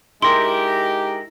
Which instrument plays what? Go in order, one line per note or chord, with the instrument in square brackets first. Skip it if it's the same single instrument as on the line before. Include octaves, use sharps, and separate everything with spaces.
[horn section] G#3 D#4 G4 [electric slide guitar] E4 A#4 [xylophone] C6